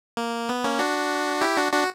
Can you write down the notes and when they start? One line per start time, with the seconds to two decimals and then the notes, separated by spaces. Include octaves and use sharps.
0.17 A#3
0.49 B3
0.64 A#3 C#4
0.79 D4 F#4
1.41 E4 G4
1.57 D4 F#4
1.73 D4 F#4